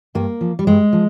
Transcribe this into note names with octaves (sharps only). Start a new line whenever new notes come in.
G2 A#3
F3
G3
G2 G#3
F3